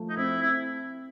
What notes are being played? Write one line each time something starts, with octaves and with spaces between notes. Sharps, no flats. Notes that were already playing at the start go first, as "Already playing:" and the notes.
Already playing: F3 A3
D#4
C4 E4
E4